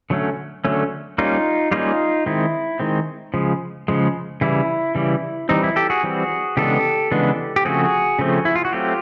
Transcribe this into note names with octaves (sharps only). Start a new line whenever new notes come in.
D3 F#3 A3 C#4
D3 F#3 A3 C#4
G3 A#3 C#4 D#4 F4
G3 A#3 C#4 D#4 F4
D#3 G#3 C4 E4
D#3 G#3 C4
C#3 F3 G#3
C#3 F3 G#3
C#3 E3 G3 E4
C#3 E3 G3
E3 G3 C4 D#4
E4
G4 A4
F#4 G#4
E3 G3 C4
C#3 E3 G#3 B3 D4 G4 A4
C#3 E3 G#3 B3 D4
G4
C#3 F3 A3 C4 F#4 G#4
C#3 F3 A3 C4
E4
F4
F#4
F#3 A3 C4 F4 G4